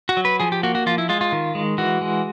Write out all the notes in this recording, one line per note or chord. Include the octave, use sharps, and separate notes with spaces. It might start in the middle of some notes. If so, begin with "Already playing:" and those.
F#4
F#3
B4
F3 G#4
G4
A#3 F#4
F#4
F3 F4
E4
G#3 F4
F4
D#3
G#3
E3 F#4
G#3